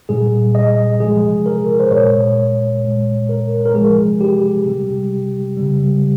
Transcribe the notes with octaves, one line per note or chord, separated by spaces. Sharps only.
A#2 G3 G#4
D#5
C3 F3 G#3 G#4
A#4
C5
A#2 G#3 C#5
A#2 G#3
A#4
A#4
C3 F3 G#3 G#4
G4
C3 G3
C#3 G3